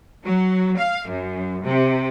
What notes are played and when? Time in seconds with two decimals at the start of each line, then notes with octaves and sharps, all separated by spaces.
0.24 F#3
0.77 F5
1.08 F#2
1.64 C3